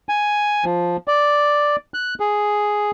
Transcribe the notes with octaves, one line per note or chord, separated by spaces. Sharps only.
G#5
F3
D5
F#6
G#4